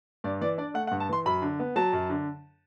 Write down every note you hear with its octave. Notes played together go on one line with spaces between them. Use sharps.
G2 D5
E3 D5
D4 D5
A3 F#5
F#5
G2
A5
E3 C6
F#2 B5
D3
B3
F#3 A5
F#2
D3